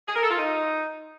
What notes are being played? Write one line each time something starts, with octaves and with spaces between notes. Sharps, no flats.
G#4
A#4
A4
F4
D#4